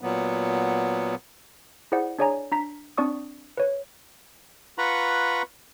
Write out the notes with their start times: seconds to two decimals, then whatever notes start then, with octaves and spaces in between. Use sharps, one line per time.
0.01 A#2 F#3 B3
1.92 E4 G#4 C5 D5 F#5
2.19 D4 G#4 C#5 D5 G#5 A#5
2.52 D4 A#5 B6
2.98 C4 D4 D5 C#6 D#6
3.57 B4 C#5
4.78 F4 B4 F#5 A#5 B5 C#6